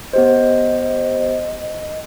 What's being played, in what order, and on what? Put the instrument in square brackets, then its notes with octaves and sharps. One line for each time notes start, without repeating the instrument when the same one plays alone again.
[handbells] B3 G4 C5 [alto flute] D#5